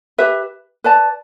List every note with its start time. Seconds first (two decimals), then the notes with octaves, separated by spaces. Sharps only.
0.18 G4 B4 E5
0.84 B4 D5 A5